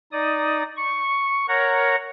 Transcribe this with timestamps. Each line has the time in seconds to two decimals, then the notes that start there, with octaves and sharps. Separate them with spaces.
0.12 D#4 D5 D#6
0.77 C#6
1.48 A#4 C#5 F#5 A#5